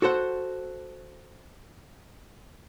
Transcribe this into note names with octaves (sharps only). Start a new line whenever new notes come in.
F#4 A4 C5 F#5